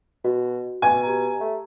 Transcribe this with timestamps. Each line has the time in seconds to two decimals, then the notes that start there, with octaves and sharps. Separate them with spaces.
0.24 B2 F#4
0.82 B2 G#5
1.03 G4 A#5
1.40 A3